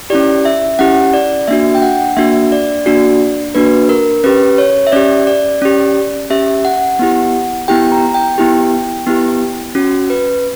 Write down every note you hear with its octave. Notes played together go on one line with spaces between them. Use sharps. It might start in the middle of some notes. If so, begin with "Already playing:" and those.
C#4 E4 G4 D5
E5
C#4 E4 G4 F#5
D5
A#3 D4 F#4 E5
G5
F#5
A#3 D4 F#4 E5
D5
A#3 D4 F#4
A#3 D4 F#4 B4
A#4
C#4 G4 B4
C#5
E5
C#4 G4 D5
D5
C#4 G4
C#4 G4 E5
F#5
B3 E4 G4
B3 E4 G4 G5
A#5
G5
B3 E4 G4
B3 E4 G4
C#4 F#4
B4